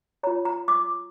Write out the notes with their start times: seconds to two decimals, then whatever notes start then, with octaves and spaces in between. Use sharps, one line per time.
0.23 F4 C#5 A#5
0.45 A#5
0.68 D6